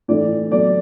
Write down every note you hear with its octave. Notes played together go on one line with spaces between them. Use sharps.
A2 E3 A3 D5
B2 F#3 A3 D5